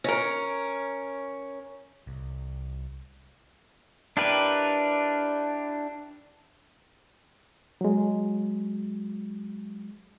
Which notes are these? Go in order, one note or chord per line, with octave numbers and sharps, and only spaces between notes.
C#4 A#4
C2
D4 E4 G4 A#4 B4
F#3 G#3